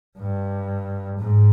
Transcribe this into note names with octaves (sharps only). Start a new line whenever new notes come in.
G2
G#2